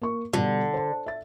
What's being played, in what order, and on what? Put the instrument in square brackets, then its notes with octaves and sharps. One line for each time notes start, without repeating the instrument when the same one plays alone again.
[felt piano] A#3 C#6
[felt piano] B2 G3 [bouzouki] D3
[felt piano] C5 A5
E5 A6